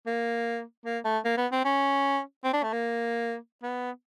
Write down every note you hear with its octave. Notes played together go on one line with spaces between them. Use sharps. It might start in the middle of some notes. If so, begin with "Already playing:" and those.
A#3
A#3
A3
A#3
B3
C4
C#4
C4
D4
A3
A#3
B3